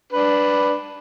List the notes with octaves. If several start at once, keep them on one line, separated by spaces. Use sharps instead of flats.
D4 B4